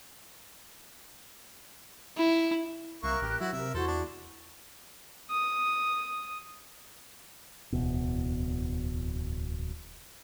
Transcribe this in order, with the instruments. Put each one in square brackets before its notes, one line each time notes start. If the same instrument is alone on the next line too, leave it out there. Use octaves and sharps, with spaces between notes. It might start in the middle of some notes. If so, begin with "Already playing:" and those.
[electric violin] E4
[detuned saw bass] C2 [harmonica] A#3 E5 C#6 [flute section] A#4 F#6
[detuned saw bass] A1 [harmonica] G4
[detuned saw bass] F#3 [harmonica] E4 F#4
[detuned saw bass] C3 [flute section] A#4 [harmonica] E5
[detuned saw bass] E2 [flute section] E4 F#4 [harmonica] A4 C5
[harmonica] D4
[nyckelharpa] D#6
[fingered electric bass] D1 E2 B2